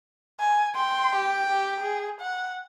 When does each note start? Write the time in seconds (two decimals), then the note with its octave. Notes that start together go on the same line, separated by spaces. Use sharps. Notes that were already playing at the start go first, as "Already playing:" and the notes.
0.39 G#5
0.75 G5 C6
1.15 G4
1.49 G4
1.80 G#4
2.21 F#5